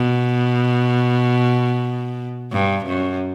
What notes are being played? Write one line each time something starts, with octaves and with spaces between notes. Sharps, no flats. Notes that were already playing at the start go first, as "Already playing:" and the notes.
Already playing: B2
G2
F#2